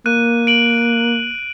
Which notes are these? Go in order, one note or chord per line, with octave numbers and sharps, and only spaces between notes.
A#3 F#6 D#7
D7 F#7